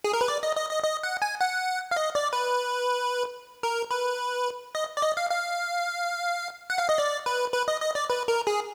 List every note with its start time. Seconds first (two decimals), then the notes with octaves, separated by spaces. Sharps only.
0.04 G#4
0.13 A#4
0.21 B4
0.28 D5
0.43 D#5
0.56 D#5
0.71 D#5
0.84 D#5
1.03 F#5
1.22 G#5
1.41 F#5
1.91 F5
1.96 D#5
2.15 D5
2.33 B4
3.63 A#4
3.91 B4
4.75 D#5
4.97 D5
5.02 D#5
5.17 F5
5.31 F5
6.70 F#5
6.78 F5
6.89 D#5
6.98 D5
7.26 B4
7.53 B4
7.68 D#5
7.81 D#5
7.95 D5
8.10 B4
8.28 A#4
8.47 G#4